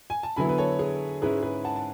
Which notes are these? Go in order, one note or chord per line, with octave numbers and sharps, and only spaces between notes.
G#5
A5
D3 F#3 B3 E4 G#5 B5
B4
A4 C#5
G#4
G#2 G#3 C#4 E4 G#4 B4
G#4 B4
F#5 A5
A5